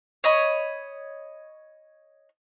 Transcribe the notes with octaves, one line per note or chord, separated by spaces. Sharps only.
C#5 D#5 B5